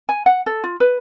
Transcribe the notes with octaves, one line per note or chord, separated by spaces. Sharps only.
G#5
F#5
A4
F4
B4